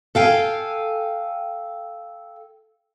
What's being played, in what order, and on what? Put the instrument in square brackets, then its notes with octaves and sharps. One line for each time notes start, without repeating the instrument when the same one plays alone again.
[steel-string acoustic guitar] A4 F5 G5 G#5